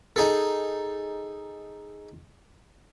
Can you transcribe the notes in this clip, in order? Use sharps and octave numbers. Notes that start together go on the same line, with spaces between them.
D#4 G#4 A4